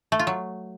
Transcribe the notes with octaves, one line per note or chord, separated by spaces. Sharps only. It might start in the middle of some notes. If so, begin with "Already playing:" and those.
A3
F4
F#3